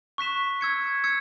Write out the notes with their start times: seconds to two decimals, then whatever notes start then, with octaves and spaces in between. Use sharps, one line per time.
0.18 C#6 F#6 B6 E7
0.61 E6 G#6 C#7
1.04 E6 G#6 C#7